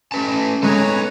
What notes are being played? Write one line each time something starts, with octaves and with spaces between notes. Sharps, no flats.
A3 C#4 B4 A5
G#2 A4 B4 C#5 D#5 A#5